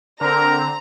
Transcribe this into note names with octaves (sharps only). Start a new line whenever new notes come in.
D3 C4 A#4 A#5